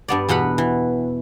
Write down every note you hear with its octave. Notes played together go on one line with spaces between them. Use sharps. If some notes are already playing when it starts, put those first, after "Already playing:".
G2 B3 D5
E2 B2 B3 F#5 B5
E3